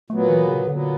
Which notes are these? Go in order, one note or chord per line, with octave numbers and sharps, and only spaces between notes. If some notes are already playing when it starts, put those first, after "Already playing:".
A#2 F#3 A3 B3
E3
C#3
A#2 D3 F#3 B3